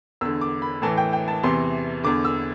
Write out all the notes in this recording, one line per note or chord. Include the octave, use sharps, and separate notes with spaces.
E2 D3 E6
D6
B5
A2 E3 A5
G5
G5
A5
E2 C3 E3 C6
E2 D3 D6
E6